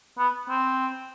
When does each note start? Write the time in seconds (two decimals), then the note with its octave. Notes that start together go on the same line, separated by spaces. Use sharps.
0.18 B3
0.49 C4